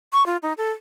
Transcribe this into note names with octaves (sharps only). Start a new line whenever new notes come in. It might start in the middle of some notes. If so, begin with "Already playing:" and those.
C#6
F4
D#4
A4